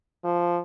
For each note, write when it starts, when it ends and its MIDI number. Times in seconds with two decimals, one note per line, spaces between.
0.24 0.59 53